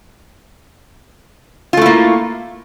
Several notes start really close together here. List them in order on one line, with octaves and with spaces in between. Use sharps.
F4 A3 E4 A#3